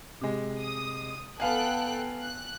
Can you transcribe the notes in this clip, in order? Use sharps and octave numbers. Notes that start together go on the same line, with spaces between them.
C3 G#3
D#6
B3 A4 F5 G5 G#5 F#6
F#6